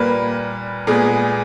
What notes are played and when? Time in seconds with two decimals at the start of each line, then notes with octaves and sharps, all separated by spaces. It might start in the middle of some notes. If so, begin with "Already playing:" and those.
Already playing: A#2 G3 A#3 B4
0.87 A#2 G#3 B3 G#4